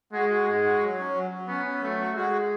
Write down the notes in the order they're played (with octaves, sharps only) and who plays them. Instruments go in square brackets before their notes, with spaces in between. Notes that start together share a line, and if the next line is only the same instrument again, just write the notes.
[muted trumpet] G#3 [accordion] F#4
[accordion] F#4
[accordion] G#2 [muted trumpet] G#3
[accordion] F#4
F#3
C#4
F#3
F#3
[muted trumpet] B3 [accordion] C#4
[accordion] C#4
[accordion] F#3 [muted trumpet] A3
[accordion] F#4
[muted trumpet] G#3 [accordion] F#4